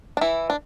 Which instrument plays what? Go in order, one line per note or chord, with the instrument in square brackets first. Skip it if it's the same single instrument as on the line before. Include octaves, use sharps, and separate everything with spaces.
[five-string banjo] D4
E3 E4
D4